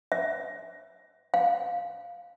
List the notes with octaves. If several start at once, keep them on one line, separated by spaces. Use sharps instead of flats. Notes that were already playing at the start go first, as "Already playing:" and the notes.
E5
F5